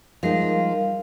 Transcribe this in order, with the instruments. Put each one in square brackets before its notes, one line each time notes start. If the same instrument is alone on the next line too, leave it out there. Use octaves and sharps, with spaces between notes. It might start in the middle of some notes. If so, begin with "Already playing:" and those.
[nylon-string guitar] F3 G#3 D#4 [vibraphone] G3 A#4 F5